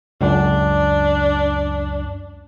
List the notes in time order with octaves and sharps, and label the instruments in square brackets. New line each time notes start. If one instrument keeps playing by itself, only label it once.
[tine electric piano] C#2 F#2 [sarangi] D4